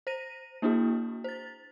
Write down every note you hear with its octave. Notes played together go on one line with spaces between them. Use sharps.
C5 A#6 D#7
A#3 D4 E4 F#4 G#4
C5 A6